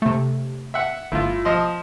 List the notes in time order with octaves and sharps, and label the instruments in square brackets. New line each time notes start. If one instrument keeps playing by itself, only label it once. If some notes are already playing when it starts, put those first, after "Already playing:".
[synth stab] C3 A3
[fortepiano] E5 F#5
[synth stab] G1 F4 [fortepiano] A2
[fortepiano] F3 D#5 C6